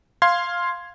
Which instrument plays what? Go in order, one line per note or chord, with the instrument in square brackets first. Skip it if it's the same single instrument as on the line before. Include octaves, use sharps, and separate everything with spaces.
[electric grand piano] F5 C6 G#6